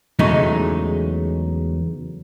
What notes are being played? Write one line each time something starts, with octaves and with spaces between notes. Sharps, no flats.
E2 C#3 F#3 G#3 A3 D#4